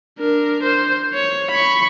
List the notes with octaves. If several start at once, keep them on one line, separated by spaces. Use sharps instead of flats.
D4 A#4
C5
C#5
B5 C#6